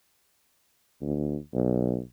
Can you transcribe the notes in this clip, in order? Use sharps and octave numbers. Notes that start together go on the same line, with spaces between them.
D2
B1